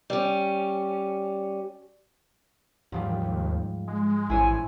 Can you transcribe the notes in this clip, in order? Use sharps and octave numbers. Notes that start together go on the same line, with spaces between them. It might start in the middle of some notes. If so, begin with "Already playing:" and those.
G3 C#4
D#2 G#2 F3 G3
G#3
A1 E4 C5 C#5 G#5